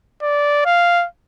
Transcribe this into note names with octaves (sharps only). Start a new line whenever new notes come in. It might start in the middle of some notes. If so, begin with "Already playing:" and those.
D5
F5